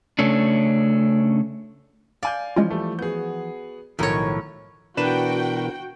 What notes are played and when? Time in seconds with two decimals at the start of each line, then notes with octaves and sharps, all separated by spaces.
0.19 C#3 A3 C#4 D4
2.23 D5 F5 G#5 G6
2.56 E3 F3 G#3 C#4 F4
2.70 G3 A3
2.99 B3 F#4 G#4 G6
3.99 B1 A2 D#3 F3 A#4 C#5
4.97 B2 E3 D4 F#4 A#4 B4 G5 E7